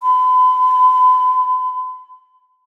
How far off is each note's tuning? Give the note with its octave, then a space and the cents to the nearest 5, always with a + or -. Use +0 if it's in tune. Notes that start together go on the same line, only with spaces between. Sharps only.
B5 +40